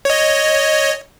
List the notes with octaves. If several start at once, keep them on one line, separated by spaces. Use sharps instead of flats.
C#5 D#5